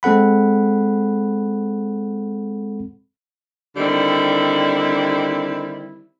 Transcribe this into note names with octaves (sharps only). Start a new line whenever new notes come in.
G#3 C4 A4 F#5 B5
D3 D#3 G3 C4 E4